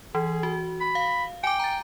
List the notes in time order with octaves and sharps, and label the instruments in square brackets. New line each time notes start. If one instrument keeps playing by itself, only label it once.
[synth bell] E3 [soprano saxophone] G#4
[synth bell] F#4
[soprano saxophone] B5
[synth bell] F5
[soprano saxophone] G5 [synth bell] G#5 D6
[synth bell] A#5 A6